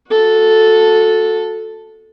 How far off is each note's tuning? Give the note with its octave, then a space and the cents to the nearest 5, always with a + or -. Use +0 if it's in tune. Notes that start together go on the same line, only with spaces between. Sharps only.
F#4 -30 A4 +0